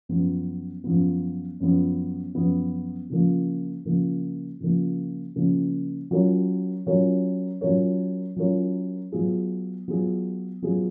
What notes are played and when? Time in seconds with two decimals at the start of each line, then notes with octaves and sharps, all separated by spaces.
0.09 F#2 F3 B3
0.84 F#2 F3 B3
1.60 F#2 F3 B3
2.35 F#2 F3 B3
3.10 C#3 F3 A#3
3.85 C#3 F3 A#3
4.60 C#3 F3 A#3
5.36 C#3 F3 A#3
6.11 F#3 C#4 F4 A#4 C#5
6.86 F#3 C#4 F4 A#4 C#5
7.61 F#3 C#4 F4 A#4 C#5
8.36 F#3 C#4 F4 A#4 C#5
9.12 F#3 B3 F4 G#4
9.88 F#3 B3 F4 G#4
10.62 F#3 B3 F4 G#4